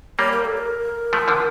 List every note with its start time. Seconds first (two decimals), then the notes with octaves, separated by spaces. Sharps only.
0.19 G3 A#3 C#5
0.32 A#4
0.45 A4
0.57 A#4
1.13 F3 A3
1.28 D3 F3